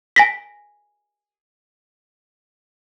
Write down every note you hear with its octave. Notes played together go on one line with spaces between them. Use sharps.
G#5 A#6 B6